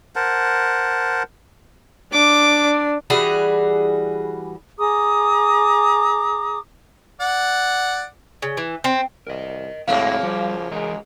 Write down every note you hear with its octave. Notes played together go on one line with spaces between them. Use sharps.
A#4 C5 F#5 A5
D4 D6
E3 G3 F#4 G#4
G#4 A#5 D6 D#6
D5 F#5
C#3
E3
C4
C2 A#4 D#5
A2 C#3 F#3 G#3 A#3 C4 C#5 F5
F3 G3
E3 G#3 A#4